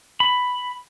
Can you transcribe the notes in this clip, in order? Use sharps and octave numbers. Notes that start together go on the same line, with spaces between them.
B5